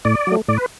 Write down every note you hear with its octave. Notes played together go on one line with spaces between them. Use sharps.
A2 D5
F#3 A3
A2 D5
B4